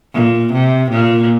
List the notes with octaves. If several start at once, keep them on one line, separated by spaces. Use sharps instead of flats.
A#2
C3
A#2